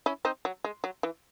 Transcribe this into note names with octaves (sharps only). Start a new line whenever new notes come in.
C#4 E4
C4 D#4
F#3
G#3
F#3
E3